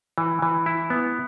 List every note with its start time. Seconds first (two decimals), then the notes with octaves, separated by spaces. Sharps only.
0.18 E3
0.42 E3
0.66 E4
0.90 B3